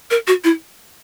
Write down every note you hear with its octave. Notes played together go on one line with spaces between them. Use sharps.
A#4
F#4
E4